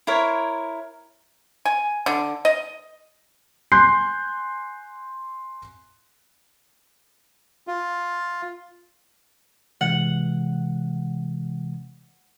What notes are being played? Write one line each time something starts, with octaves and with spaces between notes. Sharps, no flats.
E4 A#4 C5 C#5
G#5
D3
D#5
G#5 C6 F#6 G6 C7
F4
C3 E3 G#3 F#5